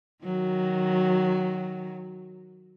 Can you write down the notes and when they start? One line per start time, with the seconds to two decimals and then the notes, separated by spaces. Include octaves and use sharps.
0.24 D#3 F#3